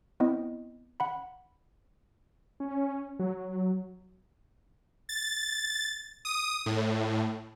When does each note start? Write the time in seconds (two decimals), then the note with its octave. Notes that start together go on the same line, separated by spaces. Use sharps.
0.20 B3 C4 E4 D#5
1.00 F#5 B5
2.60 C#4
3.19 F#3
5.09 A6
6.25 D#6
6.66 A2